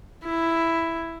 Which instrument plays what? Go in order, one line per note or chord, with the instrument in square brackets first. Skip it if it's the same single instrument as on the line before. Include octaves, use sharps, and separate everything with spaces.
[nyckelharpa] E4